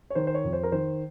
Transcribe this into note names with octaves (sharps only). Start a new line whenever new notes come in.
C#5
D#3 C5
C5
C#5
F2
C5
A#4
D#3 C5